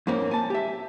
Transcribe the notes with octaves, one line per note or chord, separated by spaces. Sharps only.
F2 G#2 A#3 C4 C#4
G#5 A5
G4 E5